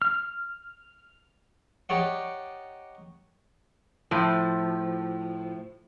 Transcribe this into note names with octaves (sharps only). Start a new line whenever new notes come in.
F6
D#4 G4 C#5 D5 F#5
A2 F3